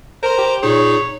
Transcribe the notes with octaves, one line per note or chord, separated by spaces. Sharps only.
A#4 C5 A#5 C6
G4
A#2 D#4 G#4 C#5